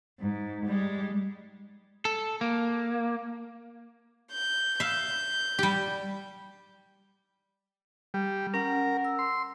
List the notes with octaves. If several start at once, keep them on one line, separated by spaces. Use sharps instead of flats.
G#2
G3 G#3
A4
A#3
G6
E5 F5 G6
G3 G4
G3
C#4 A#4 F#5
E6
C6